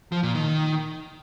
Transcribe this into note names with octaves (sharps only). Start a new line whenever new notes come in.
F3
A#2
D#3